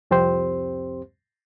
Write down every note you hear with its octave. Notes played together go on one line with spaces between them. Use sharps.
C2 F2 C4 G4 C5 C6